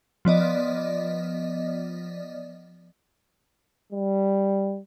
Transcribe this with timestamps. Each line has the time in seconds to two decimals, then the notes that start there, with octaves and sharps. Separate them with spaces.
0.25 F3 B3 D5 D#5
3.92 G3